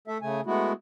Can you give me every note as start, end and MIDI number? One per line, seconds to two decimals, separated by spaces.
0.08 0.18 57
0.08 0.18 69
0.08 0.18 76
0.22 0.41 49
0.22 0.41 57
0.22 0.41 80
0.46 0.73 56
0.46 0.73 57
0.46 0.73 59
0.46 0.73 64
0.46 0.73 66